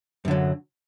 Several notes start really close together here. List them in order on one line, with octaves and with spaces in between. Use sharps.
F#2 D3 F#3